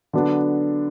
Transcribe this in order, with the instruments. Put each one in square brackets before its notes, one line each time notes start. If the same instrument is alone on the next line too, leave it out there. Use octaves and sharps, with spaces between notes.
[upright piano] D3 F#3 B3 D4